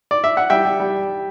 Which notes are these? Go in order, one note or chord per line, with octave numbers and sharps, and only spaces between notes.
D5
E5
F#5
G3 E5 G5
G3
G3